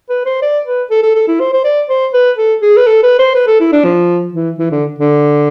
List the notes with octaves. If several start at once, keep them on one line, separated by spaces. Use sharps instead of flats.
B4
C5
D5
B4
A4
A4
A4
E4
C5
C5
D5
C5
B4
A4
G#4
B4
A4
B4
C5
B4
A4
E4
D4
F3
E3
E3
D3
D3